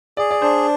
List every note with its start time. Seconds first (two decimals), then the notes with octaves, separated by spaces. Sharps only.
0.17 G#4 D5
0.31 D5
0.42 D4 C5